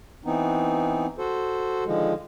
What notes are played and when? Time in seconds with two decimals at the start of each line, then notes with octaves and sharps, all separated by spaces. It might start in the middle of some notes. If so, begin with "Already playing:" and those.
0.25 E3 B3 C4 D#4
1.18 F#4 A4 C5
1.85 D3 D#3 F3 G#3